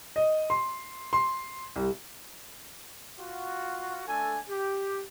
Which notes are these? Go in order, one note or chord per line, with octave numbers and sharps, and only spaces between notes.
D#5
C6
C6
C2
F4 F#4
A3 D4 A4 G#5
G4